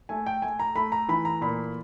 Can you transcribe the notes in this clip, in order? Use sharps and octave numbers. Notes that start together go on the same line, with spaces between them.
A3 G#5
G5
A3 G#5
A#5
A3 B5
A#5
E3 B5
A#5
A#2 B5